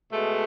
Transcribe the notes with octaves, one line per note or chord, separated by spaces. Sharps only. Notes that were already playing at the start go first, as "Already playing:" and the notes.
B2 G#3 A3